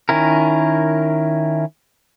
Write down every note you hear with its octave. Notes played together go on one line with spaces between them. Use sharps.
D#3 C#4 E4 A#4